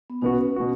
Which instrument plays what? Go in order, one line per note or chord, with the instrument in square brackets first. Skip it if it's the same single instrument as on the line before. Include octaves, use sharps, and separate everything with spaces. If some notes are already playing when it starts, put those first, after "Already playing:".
[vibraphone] B3
[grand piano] B2 B3 F#4 [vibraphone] C#4
[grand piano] B2 B3 F#4